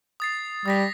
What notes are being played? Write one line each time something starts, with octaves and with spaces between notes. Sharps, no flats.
D#6 A6 C7
G3 D#6 A#6 B6